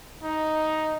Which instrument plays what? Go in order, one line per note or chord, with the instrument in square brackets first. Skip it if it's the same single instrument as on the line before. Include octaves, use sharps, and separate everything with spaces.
[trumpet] D#4